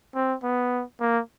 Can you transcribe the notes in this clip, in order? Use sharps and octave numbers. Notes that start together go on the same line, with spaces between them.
C4
B3
A#3